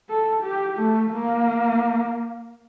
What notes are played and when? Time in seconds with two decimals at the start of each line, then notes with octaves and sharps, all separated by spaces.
0.10 A4
0.43 G4
0.78 A3
1.12 A#3